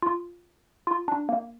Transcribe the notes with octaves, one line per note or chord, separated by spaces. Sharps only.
F4
F4
D4
A#3